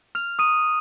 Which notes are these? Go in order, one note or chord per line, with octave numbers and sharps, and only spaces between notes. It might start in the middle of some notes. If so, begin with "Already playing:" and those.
F6 F7
A#5 C#6 D#6 F6 D#7